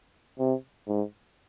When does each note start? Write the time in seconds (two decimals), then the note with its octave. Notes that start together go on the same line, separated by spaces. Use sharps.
0.39 C3
0.87 G#2